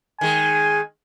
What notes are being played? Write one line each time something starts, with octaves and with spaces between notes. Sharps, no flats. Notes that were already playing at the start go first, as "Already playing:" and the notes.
D#3 G#3 G#5